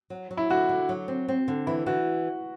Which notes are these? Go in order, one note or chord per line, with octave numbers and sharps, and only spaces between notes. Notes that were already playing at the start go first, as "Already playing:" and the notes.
F#3
F#3
E4
D3 F#4
D3
F#3
C4
C4
D3
E3 E4
E3 F#4